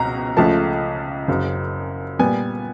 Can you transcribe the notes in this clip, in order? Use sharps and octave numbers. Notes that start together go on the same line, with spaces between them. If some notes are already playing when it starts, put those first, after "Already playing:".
Already playing: C#2 B2 A#5
C#2 C#3 F3 A3 A5
F#1 F#2 C#3
A#2 G3 B3 G#5